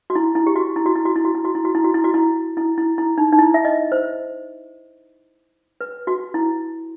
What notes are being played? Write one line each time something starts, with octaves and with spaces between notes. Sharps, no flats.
F#4
E4
E4
G4
F#4
E4
F#4
E4
F#4
E4
F#4
E4
F#4
E4
F#4
E4
F#4
E4
F#4
E4
E4
E4
E4
D#4
D#4
E4
E5
D#5
C5
B4
F#4
E4